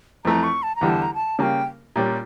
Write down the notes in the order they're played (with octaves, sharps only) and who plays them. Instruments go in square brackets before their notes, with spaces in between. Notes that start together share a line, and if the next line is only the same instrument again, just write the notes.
[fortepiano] F2 E3 A3 [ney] A#5
[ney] C#6
A5
A#5
[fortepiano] E2 D3 G3
[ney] A5
A#5
A5
[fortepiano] C#3 G3 A#3 [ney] G5 A5
[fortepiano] A#2 G3 C#4